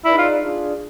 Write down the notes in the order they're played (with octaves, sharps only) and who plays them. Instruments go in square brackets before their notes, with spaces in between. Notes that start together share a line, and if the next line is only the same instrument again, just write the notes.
[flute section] D#4 G#4 B4 D5 [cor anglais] E4
[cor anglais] F4
[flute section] D4 F4 G#4